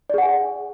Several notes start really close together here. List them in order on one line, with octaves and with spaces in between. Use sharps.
D5 G#4 F#5 G#5